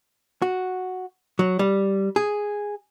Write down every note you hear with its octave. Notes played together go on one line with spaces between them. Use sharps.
F#4
F#3
G3
G#4